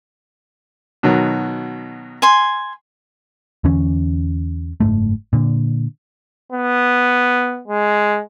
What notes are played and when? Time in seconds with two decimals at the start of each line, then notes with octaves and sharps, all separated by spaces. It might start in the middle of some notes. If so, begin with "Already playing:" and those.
1.03 B2 D#3 F#3
2.22 G#5 C6
3.64 E2 D3 E3 C#4
4.80 F#1 C#2 G#2 A3
5.33 A#2 D3
6.52 B3
7.67 G#3